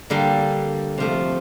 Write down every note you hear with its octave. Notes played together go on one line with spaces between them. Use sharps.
D3 G3 A#3 D4 A4
C3 F3 A3